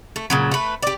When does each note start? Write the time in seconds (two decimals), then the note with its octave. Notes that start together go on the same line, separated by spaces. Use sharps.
0.16 A3
0.30 A#2 C#3 F#3
0.51 A3 B4
0.82 G4 D5